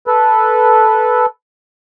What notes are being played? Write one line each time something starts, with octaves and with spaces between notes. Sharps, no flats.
A4 B4